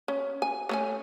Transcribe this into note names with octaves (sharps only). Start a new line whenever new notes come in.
C#4
G#5
A3 C#4 G#5